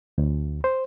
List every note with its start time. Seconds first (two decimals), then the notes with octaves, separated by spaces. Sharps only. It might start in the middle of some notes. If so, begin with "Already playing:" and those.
0.18 D2
0.64 C5